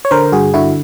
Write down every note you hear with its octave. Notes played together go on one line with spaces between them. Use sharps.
C#5
D3 A#4 C5
G2 F#4 G#4
D3 E4 F#4